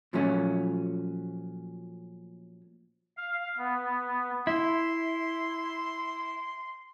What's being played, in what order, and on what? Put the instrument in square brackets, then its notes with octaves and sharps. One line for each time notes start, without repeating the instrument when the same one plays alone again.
[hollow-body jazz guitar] A#2 F3 F#3 A3 C#4
[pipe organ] F5
B3
[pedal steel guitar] E4 [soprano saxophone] C6